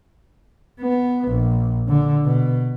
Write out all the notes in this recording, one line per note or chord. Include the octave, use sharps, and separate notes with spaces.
B3
A#1
D3
B2